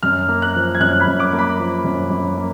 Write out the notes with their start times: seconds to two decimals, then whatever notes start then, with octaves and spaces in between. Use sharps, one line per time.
0.03 F#2 F6
0.28 A#3
0.42 F#6
0.55 F3
0.75 G#6
0.80 F#2 F#6
1.00 B5
1.07 F#2
1.20 D6
1.33 A#3
1.39 B5
1.59 F3
1.84 F#2
2.10 F#2
2.37 A#3